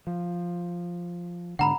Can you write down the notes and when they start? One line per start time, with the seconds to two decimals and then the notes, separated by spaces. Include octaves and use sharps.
0.07 F3
1.59 G#2 D3 F#5 A#5 B5